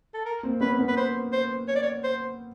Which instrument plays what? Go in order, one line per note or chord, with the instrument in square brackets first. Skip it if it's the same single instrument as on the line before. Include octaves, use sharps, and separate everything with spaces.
[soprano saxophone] A4
A#4
[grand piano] A#3 C4
[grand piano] B3 C#4 [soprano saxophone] B4
[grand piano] B3 C#4
[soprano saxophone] B4
C5
C5
C#5
D5
C#5
C5